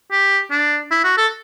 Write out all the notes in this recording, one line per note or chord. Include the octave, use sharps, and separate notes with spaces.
G4
D4
E4
F#4
A4